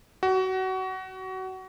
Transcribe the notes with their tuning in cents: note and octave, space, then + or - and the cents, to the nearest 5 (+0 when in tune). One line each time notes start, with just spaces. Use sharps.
F#4 +25